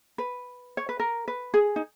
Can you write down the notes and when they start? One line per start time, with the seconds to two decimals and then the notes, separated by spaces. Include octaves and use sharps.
0.18 B4
0.77 C#5
0.89 B4
1.00 A#4
1.28 B4
1.54 G#4
1.76 D#4